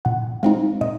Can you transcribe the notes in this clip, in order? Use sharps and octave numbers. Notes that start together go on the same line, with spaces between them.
A#2 F#5
G#3 C4 D#4 F5
A#2 D#5